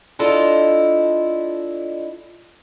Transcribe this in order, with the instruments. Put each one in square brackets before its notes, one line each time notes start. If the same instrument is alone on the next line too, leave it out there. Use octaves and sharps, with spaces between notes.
[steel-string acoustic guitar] D4 E4 F4 A4 D#5